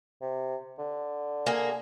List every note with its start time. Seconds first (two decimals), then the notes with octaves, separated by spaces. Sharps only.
0.21 C3
0.79 D3
1.46 A#3 G#4